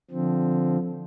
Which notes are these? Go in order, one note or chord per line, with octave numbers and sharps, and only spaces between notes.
D3 F3 C4